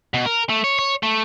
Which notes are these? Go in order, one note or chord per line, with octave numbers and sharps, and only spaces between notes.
B2
A#4
A3
C#5
C#5
A3